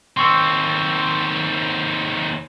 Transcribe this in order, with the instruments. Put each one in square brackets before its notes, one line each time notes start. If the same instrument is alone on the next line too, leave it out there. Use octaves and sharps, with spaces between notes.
[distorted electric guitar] D#2 C4 [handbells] C6 C#6 E6